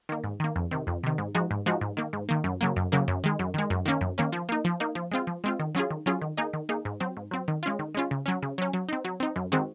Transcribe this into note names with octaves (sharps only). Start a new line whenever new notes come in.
D#3 A#3
G#2
D#3 A#3
F2
C3 D#3
F2
C3 D#3
G#2
F3 G#3 D#4 F#4
G#2
F3 G#3 D#4 F#4
G#2
D#3 A#3
G#2
D#3 A#3
F#2
C#3 F#3 A#3
F#2
C#3 F#3 A#3
F#2
D#3 G#3
F#2
D#3 G#3
F#2
D#3 A#3 C#4
F#2
D#3 A#3 C#4
F3
A#3 D#4
F3
A#3 D#4
F3
G#3 C4 F4
F3
G#3 C4 F4
D#3
F#3 C#4 F4 G#4
D#3
F#3 C#4 F4 G#4
D#3
A#3 D#4 G#4
D#3
A#3 D#4 G#4
G#2
F#3 C4
G#2
F#3 C4
D#3
G#3 C#4 F4
D#3
G#3 C#4 F4
C#3
F#3 C#4
C#3
F#3 C#4
F#3
C4 D#4
F#3
C4 D#4
F#2
D#3 G#3 C4 F#4